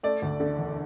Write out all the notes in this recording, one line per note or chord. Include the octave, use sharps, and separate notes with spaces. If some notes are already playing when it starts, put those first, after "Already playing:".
A3 D5
D2
D3
E1